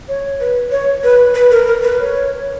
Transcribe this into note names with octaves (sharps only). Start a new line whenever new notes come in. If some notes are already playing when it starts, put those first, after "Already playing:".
C#5
B4
C#5
B4
B4
A#4
A#4
B4
C#5